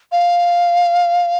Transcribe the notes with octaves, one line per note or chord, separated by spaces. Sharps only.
F5